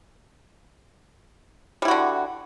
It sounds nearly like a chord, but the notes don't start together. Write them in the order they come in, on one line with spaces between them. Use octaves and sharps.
G3 E4 F#4 D3